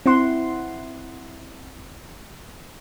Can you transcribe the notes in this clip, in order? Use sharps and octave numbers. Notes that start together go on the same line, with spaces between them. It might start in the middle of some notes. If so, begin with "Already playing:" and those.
C4 E4 F#5 C6